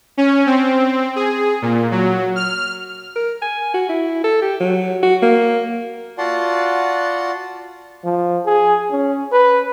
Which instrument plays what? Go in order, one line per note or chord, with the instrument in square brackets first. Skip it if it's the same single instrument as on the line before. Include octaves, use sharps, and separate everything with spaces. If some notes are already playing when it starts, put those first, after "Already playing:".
[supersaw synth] C#4
C4
G#4
A#2
F#3
F6
[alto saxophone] A#4
G#5
F#4
E4
A4
G4
F#3
F#4
A#3
[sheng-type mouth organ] F4 F#4 D5 F#5 A5 C6
[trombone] F3
G#4
C#4
B4